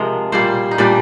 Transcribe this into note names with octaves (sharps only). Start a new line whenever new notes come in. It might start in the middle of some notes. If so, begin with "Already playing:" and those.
Already playing: C3 F3 G#3 A#4
A#2 G3 A#3 C5
D#4
A#2 G3 A#3 D4